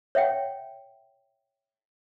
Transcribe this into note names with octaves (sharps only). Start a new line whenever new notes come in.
C#5 E5 F#5 G5